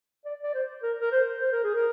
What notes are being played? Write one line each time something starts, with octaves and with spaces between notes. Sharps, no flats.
D5
D5
C5
A#4
A#4
C5
C5
A#4
G#4
A#4